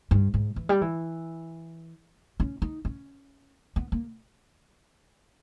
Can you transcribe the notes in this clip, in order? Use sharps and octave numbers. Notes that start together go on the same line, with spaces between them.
G2
G#2
E3
G3
E3
C#4
D#4
C#4
B3
A#3